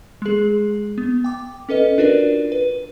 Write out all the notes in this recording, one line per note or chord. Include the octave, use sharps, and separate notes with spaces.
G#3 G#4
B3
G5 D6
C#4 A4 B4 D#5
D4 F4 F#4 A#4 B4 D5
B4